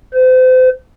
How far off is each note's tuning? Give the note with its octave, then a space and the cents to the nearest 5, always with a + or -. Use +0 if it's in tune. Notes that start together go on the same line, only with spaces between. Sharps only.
C5 -35